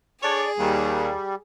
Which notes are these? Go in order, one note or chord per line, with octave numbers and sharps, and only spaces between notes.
D4 G#4 A4 C#5 D5
D#2 G3